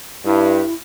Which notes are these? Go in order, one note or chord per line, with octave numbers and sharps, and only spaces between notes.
G2 E4